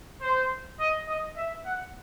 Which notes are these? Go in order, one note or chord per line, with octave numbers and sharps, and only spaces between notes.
C5
D#5
D#5
E5
F#5